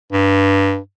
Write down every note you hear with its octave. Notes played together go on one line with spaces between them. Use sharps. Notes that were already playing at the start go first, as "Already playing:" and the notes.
G2